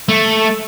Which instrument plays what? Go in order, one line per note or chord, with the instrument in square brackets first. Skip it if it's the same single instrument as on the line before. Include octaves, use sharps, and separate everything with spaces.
[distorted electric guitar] A3